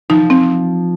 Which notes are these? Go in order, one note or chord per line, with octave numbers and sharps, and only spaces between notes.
F3 D#4
C4